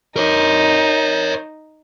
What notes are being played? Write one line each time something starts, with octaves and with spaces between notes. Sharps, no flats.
D#4 A#4 C#5